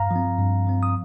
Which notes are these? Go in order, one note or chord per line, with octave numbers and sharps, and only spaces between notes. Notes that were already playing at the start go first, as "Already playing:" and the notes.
Already playing: G2 F5 A#5
F3 C4
G2
F3 C4
D#6